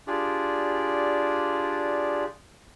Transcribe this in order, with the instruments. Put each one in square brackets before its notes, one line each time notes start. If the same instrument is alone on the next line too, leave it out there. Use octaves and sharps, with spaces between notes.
[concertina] D4 F4 G4 G#4 D5